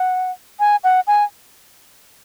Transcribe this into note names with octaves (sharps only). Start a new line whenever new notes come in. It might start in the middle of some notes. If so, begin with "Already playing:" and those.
Already playing: F#5
G#5
F#5
G#5